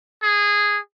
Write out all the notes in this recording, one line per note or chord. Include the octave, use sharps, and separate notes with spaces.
G#4